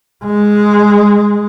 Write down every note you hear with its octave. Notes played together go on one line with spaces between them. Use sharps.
G#3